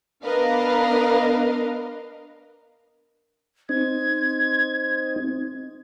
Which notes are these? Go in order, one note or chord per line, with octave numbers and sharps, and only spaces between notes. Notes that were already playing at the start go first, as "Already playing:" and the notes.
B3 D4 A#4 B4 D#5 F5
C4 D#4 G#6